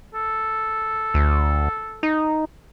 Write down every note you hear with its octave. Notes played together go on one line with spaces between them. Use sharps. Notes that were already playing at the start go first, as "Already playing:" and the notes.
A4
D2
D#4